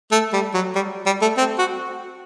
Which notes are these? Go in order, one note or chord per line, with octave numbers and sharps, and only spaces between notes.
A3
G3
F#3
G3
G3
A3
C4
F#4